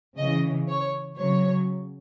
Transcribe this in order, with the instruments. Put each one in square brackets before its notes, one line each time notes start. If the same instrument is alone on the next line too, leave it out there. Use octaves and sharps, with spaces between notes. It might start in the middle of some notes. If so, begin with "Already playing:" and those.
[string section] C#3 E3 D#5
C#5
C#3 F#3 C#5